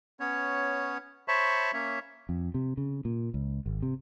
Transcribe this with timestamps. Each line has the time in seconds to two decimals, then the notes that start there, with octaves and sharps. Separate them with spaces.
0.20 B3 C#4 C#5
1.28 C5 C#5 E5 A5 B5 C#6
1.73 A#3 C#4 C#5 E5
2.29 F2
2.54 C3
2.77 C#3
3.05 A#2
3.34 C#2
3.66 G#1
3.82 C3